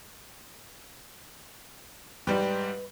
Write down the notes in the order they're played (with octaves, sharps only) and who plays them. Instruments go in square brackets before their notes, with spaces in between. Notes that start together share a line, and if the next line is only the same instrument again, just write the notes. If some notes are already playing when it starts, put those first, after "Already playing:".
[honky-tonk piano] G#2 G3 G4 [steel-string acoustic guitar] B4